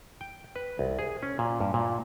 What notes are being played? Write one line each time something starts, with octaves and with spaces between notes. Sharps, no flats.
G5
B4
C2
G#4
C#4
A#2
G2
A#2